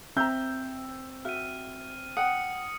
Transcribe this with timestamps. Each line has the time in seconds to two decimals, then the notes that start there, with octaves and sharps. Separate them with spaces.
0.16 C4 E5 A#5 E6 G6
1.25 F#4 E5 F6 D#7
2.17 F#5 G5 D#6 C#7